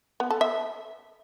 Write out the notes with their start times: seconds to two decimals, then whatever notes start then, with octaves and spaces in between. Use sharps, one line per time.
0.20 B3
0.30 A4
0.41 E5